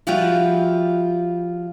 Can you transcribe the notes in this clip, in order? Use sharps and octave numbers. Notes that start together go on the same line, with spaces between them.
F3 G3 F4 F#4 E5 G5